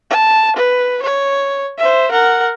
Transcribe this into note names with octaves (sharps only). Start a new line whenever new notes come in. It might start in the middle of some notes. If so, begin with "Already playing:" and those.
A5
B4
C#5
C5 E5
A#4 F#5